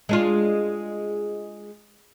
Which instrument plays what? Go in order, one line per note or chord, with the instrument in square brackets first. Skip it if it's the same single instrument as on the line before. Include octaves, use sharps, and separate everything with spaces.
[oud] G#3 D4 F4